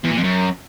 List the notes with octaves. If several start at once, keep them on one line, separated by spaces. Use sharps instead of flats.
E2
A#2
F2
F#2